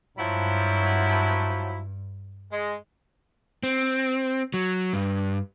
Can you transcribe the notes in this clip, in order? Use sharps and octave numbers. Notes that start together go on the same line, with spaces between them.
G2 F3 F#3 E4
G#3
C4
F#3
G2